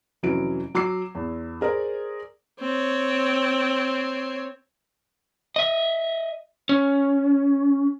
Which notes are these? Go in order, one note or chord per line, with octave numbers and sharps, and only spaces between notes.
F1 E3 F#3 C#4 D7
F#3 D6 E6 C7
E2
G#4 A#4 C5 D5
C4 C#5
D#5 E5
C#4